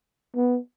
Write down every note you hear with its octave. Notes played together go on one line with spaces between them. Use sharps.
B3